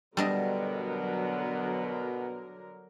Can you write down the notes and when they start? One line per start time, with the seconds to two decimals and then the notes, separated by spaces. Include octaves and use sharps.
0.17 B2 D3 F#3 G3 B3 D4 A#4 D#5